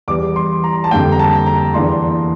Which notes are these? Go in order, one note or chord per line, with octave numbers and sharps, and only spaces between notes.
E2 E3 G3 D6
C6
A#5
A5
F2 D3 G3 A#3 G5
A#5
A5
A#5
E2 E3 A#3 D4 C6